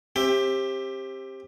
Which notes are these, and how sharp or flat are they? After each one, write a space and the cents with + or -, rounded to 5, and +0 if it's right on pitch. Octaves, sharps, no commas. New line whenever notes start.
C4 +25 G4 +10 E5 +10